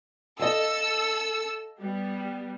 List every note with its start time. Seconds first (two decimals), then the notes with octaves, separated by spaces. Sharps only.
0.39 A4 D#5 F5 E6
1.82 G3 B3